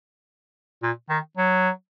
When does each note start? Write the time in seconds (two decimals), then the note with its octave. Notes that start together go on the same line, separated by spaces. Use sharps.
0.83 A#2
1.10 D#3
1.37 F#3